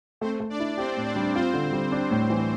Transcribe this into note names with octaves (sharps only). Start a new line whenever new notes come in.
A3 C4 C5
A3
D4 D5
E4
C4 G4 C5
A2
D4 D5
G3
C4 F4 C5
D3
G3
D4
A2
E3